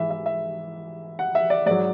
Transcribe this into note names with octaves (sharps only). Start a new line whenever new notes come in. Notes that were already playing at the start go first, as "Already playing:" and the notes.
Already playing: G#2 E3 E5
E5
E5
F#5
E5
D5
G#2 F#3 D5